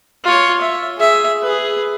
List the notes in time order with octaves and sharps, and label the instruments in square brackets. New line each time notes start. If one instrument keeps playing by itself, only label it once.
[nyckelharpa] F4 C#5
E5
G#4 E5
G#4 B4